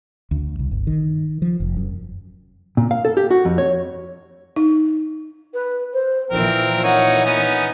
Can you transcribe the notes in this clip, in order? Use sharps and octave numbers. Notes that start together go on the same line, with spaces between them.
D2
C2
G1
D#3
F3
F1
F#2
A#2
F5
A4
G4
F#4
F2
C#5
D#4
B4
C5
A#2 E3 F3 C4 A#4
D#4 C#5 F#5
B3 C#4 D#4